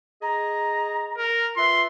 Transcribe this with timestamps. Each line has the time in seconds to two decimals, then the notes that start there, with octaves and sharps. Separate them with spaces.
0.22 G#4 D#5 A#5
1.17 A#4
1.57 F4 B4 E5 C6